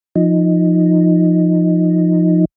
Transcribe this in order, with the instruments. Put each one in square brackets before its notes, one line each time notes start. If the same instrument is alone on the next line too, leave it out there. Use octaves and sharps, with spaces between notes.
[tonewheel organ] F3 D#4